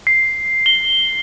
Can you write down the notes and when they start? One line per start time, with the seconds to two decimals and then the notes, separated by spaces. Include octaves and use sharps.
0.07 C7
0.66 G7